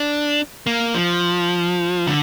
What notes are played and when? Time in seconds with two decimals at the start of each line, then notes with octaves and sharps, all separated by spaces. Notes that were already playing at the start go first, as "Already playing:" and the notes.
Already playing: D4
0.67 A#3
0.95 F3
2.07 D3